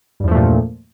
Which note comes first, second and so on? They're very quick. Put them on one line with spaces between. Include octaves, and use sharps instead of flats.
G2 E2 F3 A3 A#2